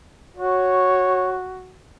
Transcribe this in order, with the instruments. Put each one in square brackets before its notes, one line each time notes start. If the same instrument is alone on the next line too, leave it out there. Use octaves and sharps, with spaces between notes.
[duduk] F#4 [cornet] C#5